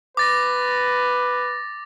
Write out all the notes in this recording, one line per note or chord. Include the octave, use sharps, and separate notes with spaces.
B4 D6 A6 A#6